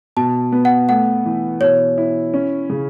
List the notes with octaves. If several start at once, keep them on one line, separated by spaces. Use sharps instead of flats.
B2 A5
B3
F#5
A3 F#5
E3
B2 C#5
E4
C#4
C#3